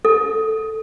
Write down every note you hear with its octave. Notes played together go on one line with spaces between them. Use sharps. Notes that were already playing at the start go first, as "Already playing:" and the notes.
A4